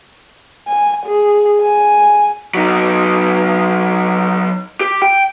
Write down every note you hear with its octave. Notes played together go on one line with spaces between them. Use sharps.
G#5
G#4
G#5
F#3 D#4
G4
G5